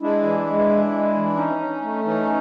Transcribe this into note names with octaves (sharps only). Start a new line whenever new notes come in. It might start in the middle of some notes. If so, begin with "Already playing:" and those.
G#3 D4 E4
E3
G#3
E3
G#3
E3
C#4 D#4
C#4
A3
E3 C#4 D#4